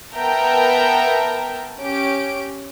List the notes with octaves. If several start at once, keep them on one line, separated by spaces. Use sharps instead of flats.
B3 A#4 E5 G5 A5 A#5
C#4 G4 D7